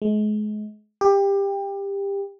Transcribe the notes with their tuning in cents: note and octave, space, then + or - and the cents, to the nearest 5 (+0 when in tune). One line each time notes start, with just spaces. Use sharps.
G#3 +35
G4 +20